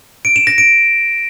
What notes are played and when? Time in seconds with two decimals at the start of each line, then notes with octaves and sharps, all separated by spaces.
0.25 D7
0.36 E7
0.47 A#6
0.58 D7